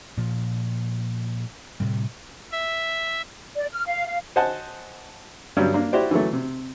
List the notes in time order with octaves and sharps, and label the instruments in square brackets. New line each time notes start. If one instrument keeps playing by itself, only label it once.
[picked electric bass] A#2 F3
A2 C3 G3
[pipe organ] E5
[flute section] D5
F6
F5
F5
[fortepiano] C5 D#5 F#5 G#5 A5
G2 F#3 G3
A#3 D4
E4 F#4 G4 C5 D5
E3 F#3 A3
C3